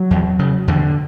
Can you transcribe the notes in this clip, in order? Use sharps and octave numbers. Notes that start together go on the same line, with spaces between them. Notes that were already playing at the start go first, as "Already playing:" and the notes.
Already playing: F#3
E2
C#3
E2 D3